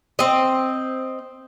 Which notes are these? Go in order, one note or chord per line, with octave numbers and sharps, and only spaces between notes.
C4 D#5